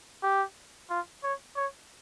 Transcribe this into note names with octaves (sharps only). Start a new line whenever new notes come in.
G4
F4
C#5
C#5